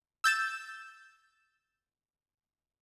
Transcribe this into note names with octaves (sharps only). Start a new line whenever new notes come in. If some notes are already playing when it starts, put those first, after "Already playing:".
E6 G6 A6 E7